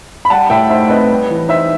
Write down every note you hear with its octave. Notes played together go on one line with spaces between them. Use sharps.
B5
G3 F#5 A5
A2 E5 G5
D#4 C5 E5
C4 B4 D#5
G3
E3
D#4 C5 E5